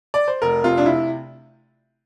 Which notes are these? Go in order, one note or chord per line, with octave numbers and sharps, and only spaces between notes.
D5
C5
F1 A#4
C3 F4
D4
E4